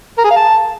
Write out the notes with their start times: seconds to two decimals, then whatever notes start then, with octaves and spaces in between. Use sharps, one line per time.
0.18 A#4
0.24 G#4
0.30 F5
0.36 A5